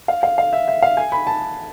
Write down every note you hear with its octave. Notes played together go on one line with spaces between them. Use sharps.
F5
F5
F5
E5
E5
F5
G#5
B5
A5